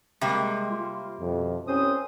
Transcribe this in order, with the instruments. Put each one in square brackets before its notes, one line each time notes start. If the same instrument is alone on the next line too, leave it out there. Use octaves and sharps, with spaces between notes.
[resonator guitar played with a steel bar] C3 G3 A#3 [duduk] G#3
[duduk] F4
[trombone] F2 [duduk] B2
[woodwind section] C2 C5 D#6 [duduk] C4 [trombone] C#4